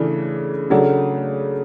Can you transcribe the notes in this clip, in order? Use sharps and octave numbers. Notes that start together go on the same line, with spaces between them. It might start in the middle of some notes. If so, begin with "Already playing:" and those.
Already playing: C#3 E3 A3 D4
C#3 F#3 A3 D4